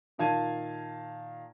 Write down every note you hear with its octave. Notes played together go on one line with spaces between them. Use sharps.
A#2 D#3 F5 A5 G#6 D#7